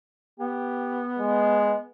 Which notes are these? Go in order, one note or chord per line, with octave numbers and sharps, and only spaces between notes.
B3 G4
G#3